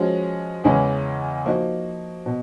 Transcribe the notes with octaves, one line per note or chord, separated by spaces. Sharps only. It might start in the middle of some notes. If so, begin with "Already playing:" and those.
Already playing: F3 G#3 C#4 F#4
E2 C#3 E3 G#3 C#4
F3 A#3 D#4 F#4
B2